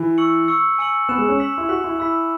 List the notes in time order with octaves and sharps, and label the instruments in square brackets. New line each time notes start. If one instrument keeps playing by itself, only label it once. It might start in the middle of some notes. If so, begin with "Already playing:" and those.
Already playing: [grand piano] E3
[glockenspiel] C#6 E6 C#7 F#7
C#6 E6 C#7
G#5 E6 C#7 F#7
[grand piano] B3 [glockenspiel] F#6 E7
[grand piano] G#3
C#4
[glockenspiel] E6 B6 F#7
[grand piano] E4
[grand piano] F#4 [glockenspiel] F#6 B6 F#7
[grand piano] E4
[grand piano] E4 [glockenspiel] B5 E6 B6